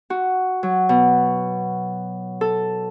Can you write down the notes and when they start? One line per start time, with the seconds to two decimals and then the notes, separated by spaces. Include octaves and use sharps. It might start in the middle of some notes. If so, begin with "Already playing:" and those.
0.10 F#4
0.63 F#3
0.89 B2
2.41 A4